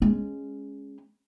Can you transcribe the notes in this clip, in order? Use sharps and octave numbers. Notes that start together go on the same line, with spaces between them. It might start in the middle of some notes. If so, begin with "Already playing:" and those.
G#3 C#4